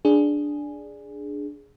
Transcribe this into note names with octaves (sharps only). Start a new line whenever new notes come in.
D4 G#4